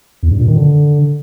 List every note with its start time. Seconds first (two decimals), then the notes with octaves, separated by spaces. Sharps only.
0.23 E2
0.31 G2
0.40 A#2
0.48 D#3
0.56 D3